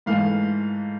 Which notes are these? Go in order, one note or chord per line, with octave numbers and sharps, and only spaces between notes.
G#2 E3 A3 F5